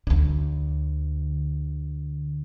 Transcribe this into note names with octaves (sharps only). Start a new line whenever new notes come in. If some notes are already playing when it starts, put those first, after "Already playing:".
D2 D3